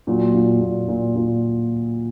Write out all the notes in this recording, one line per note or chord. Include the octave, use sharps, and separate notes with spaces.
A#2 F#3
A#2
A#2
A#2
A#2